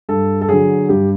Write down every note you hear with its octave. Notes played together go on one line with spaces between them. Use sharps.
G2 A4
A4
D3 F#3 G#4
G2 G4